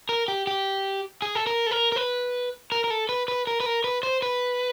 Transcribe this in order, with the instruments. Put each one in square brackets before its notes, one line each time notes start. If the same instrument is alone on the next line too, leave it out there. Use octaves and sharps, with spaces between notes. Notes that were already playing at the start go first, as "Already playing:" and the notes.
[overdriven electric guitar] A#4
G4
G4
G#4
A4
A#4
A4
A#4
A#4
B4
A#4
A#4
A4
B4
B4
A#4
B4
A#4
B4
C5
B4